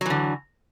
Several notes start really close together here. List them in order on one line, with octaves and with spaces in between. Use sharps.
F#3 E3 D3